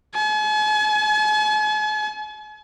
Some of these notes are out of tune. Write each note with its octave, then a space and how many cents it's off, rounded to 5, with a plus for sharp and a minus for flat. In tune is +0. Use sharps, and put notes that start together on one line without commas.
G#5 +45